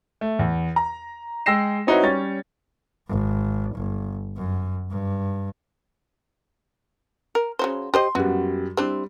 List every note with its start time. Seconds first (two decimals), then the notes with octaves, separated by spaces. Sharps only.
0.21 A3
0.39 E2
0.76 A#5
1.46 G#3 G5 E6 A#6 C7 E7
1.87 C4 D#4 E4 F#4 B4 C#5
2.03 G3 C#4 C#5 A6
3.08 G#1
3.75 G1
4.37 F#2
4.90 G2
7.35 A#4
7.59 C#3 F#3 C5
7.94 G4 C5 D#5 C6
8.15 F#2 G3 B3 F#4
8.77 G3 C4 D4 E4